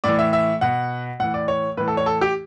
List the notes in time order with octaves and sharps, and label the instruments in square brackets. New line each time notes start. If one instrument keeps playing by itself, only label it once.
[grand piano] A2 E3 D5
E5
E5
B2 F#5
A2 E3 F#5
D5
C#5
A2 E3 B4
A4
C#5
A4
G4